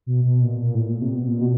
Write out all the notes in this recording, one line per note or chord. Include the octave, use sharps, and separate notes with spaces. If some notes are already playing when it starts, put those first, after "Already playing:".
B2
B2
A#2
A#2
A2
A#2
C3
B2
A#2
B2